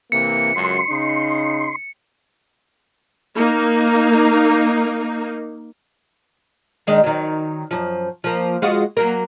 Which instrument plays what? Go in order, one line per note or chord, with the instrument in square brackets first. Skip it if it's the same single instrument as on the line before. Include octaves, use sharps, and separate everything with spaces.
[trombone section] C3 E3 A#3 [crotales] C#7
[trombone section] C#2 F#2 [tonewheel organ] C6
[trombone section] C#3 D#4
[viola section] A#3 D#4
[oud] D#3 G#3 D4
D#3 F#3
F#2 F3
F3 A#3
G#3 F4 F#4
F#3 A#3 A#4